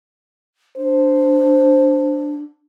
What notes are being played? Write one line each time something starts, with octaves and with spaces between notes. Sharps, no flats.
D4 C5